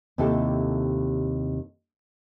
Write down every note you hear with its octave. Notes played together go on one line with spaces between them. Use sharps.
D#2 C3 E4 G4 A4 A5